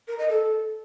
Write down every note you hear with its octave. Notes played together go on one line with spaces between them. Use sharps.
A#4
D#5
A4